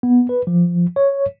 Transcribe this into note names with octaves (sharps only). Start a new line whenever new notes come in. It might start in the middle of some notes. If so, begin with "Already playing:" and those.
B3
B4
F3
C#5